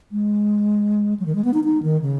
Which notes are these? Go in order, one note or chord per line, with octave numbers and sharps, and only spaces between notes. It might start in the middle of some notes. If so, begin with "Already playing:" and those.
G#3
F#3
D#3
G#3
B3
D#4
D#4
D#3
C#3